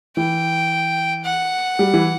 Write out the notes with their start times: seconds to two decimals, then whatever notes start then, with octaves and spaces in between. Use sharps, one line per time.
0.16 E3 G5
1.25 F#5
1.79 G3
1.94 E3